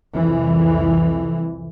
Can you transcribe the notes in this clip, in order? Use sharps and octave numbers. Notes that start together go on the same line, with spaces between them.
C2 F2 E3